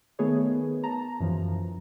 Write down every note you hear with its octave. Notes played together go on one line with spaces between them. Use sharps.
D#3 A3 B3 G#4 B4 C#5
A5 A#5
F#2 E3 F3